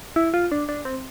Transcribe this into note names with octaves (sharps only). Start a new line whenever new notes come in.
E4
F4
D4
D4
C4